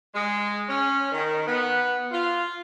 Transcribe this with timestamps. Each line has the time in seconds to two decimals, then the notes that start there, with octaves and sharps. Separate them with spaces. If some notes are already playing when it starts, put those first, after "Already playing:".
0.13 G#3
0.68 C#4
1.12 D#3
1.46 B3
2.11 F4